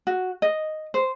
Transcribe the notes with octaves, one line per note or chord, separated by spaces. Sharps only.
F#4
D#5
C5